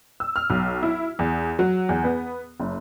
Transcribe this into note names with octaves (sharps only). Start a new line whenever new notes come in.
E6
F6
B1
E4
E2
F#3
E2
B3
F#1